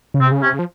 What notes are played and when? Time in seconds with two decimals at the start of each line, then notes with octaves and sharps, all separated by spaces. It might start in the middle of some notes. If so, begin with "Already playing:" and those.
0.14 C#3
0.20 C3 C4
0.32 C#3
0.42 C3 C#4
0.54 C#3
0.59 F3